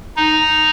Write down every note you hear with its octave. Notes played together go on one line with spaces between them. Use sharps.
D#4